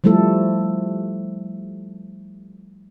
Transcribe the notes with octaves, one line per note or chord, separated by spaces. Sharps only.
F3 G3 A3 E4 A4